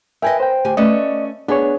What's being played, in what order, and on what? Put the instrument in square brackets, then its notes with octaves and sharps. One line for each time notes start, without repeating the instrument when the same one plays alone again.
[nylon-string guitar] A#4 B4 D#5 [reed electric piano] E5 G5 G#5
[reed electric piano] C5 G5
[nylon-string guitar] D2 G4 G#5
[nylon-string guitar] A3 C#4 B4 [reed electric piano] D5 D#5
[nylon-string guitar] B3 [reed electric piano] D4 G#4 C#5